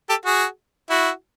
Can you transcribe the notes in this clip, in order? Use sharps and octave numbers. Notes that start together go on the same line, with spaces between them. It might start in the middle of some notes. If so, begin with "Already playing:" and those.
G4 A4
F#4 G#4
E4 F#4